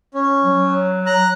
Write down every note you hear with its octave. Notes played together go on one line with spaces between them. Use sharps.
C#4
F#3
A#5 F#6